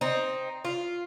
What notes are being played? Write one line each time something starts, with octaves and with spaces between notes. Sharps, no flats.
C4 D#4
F4